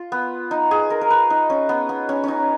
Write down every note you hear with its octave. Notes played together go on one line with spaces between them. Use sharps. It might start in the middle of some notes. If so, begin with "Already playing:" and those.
Already playing: F4
B3
D#4
G#4
A#4
A#4
B4
D#4
C#4
B3
B3
C#4
C#4 D#4